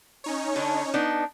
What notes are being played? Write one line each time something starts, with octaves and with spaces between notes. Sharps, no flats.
C#4 D#4 C#5
D3 D4
B3 D4 D#4